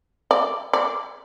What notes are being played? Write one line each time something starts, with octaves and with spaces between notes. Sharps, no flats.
D5
D5